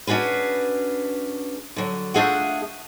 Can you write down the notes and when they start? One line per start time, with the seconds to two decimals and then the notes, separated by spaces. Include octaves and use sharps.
0.07 C#4 D4 F#4 G#4 B4
1.76 D3 F#3
2.14 A3 D4 F4 G#4 E5 F#5